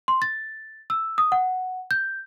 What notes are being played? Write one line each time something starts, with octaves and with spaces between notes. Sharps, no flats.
C6
A6
E6
D#6
F#5
G6